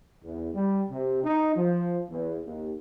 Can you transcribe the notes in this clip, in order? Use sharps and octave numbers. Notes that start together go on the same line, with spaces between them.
E2
G3
C3
D#4
F3
E2
D#2